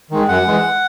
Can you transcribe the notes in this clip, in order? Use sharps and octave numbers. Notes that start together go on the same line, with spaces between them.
D#3 G#3
F#2 F#5
E3 G#3